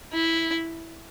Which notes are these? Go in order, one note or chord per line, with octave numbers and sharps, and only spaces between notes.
E4